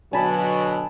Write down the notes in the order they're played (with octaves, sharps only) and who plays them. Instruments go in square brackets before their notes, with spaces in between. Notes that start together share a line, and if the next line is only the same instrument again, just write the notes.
[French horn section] B2 D3 F#3 [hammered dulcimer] G#5 A5 B5